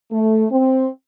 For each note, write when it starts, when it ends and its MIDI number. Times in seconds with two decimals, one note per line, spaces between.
0.11 0.46 57
0.51 0.89 60